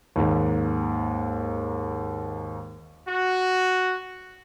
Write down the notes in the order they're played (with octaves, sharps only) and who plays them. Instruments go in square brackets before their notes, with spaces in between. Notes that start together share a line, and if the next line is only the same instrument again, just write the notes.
[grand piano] D#2 G#2 A#3
[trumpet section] F#4